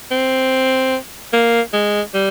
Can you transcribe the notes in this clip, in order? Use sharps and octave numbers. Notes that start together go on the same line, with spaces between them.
C4
A#3
G#3
G3